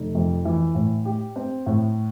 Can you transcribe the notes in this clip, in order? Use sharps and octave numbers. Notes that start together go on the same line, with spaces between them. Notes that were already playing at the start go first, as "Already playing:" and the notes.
Already playing: F1
F2
E3
A2
G4
C4
A2